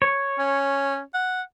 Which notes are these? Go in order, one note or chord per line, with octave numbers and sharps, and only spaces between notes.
C#5
C#4
F#5